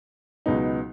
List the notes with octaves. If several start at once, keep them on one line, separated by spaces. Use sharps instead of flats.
C#2 B2 F#3 B3 D#4